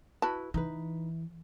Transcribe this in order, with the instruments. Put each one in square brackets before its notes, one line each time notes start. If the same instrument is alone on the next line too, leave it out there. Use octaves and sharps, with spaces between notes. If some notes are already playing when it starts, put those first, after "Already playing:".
[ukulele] E4 F#4 B4 [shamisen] A5
[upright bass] E3 [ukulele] D#4 B4